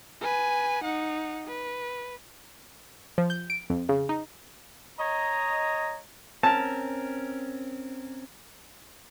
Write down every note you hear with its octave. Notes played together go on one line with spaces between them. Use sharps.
B4 G#5
D#4 F#5
B4
F3
G6
D7
F2
C#3
D#4
C#5 D#5 A#5
C4 C#4 A#4 A5